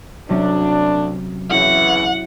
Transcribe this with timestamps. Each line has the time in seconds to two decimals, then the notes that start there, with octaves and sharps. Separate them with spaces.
0.29 D2 C3 F#3 C#4 D4
1.51 C#3 E3 C#4 E4 F#4 F#5